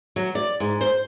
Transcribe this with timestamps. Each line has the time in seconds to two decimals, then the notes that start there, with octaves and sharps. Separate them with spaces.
0.16 F#3
0.35 D5
0.60 G#2
0.81 C5